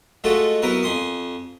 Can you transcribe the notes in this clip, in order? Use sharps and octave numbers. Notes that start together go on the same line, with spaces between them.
G#3 A3 F4 F#4 A4
F#3 B3 E4 A#4 B4
F2 G#5 C6 D#6